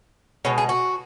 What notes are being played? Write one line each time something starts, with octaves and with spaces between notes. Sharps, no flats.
B2 G#3 C#5
G#4
F#4